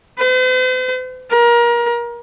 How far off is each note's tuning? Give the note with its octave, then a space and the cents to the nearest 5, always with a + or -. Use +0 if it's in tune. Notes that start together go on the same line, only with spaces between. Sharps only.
C5 -45
A#4 +30